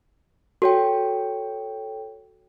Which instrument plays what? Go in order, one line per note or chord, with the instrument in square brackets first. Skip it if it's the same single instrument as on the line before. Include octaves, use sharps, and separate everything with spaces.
[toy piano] F#4 [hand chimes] A4 C#5 G5